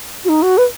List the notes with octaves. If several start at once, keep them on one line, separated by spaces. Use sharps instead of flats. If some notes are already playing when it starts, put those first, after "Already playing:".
F#4
D#4
F#4
B4